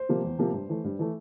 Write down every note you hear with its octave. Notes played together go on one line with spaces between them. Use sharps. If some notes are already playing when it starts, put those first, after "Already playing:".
Already playing: C5
C3 F3 A#3
E2
C3 F3 A#3
G2
E3 A3
G2
E3 A3